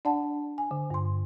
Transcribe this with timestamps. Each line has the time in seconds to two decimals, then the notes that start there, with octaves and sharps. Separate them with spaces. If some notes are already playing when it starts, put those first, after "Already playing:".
0.05 D4 D5 F#5 A5
0.58 G#5
0.71 D3
0.90 G2 C6